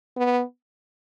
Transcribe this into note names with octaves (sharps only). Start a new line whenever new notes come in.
B3